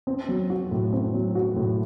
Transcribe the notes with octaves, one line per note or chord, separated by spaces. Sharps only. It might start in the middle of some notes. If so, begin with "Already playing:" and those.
C4
F#3
F#4
A2
C4
F#3
F#4
A2